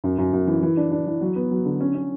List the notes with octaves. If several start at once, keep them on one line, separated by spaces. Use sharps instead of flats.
F#2
F#2
F#2
E3
E3
D4
D4
E3
F#3
B3
F#3
D3
C#4
C#4